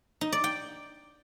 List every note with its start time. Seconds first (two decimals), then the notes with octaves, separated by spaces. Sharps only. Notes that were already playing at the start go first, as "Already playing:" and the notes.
0.21 D#4
0.32 D5
0.44 G5